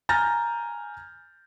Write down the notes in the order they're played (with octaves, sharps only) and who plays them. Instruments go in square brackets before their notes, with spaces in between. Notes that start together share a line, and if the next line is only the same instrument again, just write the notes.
[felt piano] G#5 A#5 F6 G6 A6 A#6